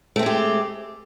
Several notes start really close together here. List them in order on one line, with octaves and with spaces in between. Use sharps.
A3 C4 G#3 G4